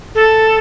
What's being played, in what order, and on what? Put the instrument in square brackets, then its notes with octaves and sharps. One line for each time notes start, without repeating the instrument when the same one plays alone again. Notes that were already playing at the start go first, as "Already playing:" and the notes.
[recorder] A4